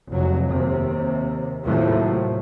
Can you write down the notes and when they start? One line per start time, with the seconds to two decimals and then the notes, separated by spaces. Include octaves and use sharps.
0.10 F1 F#3
0.49 D#2 C3
1.64 D#2 A2 C3 F3 F#3 A3